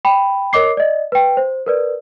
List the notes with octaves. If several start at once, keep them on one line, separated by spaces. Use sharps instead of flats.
G5 B5
A#4 C#5 D#5 D6 C7
D5 D#5
B4 G5
C5
A#4 B4 D5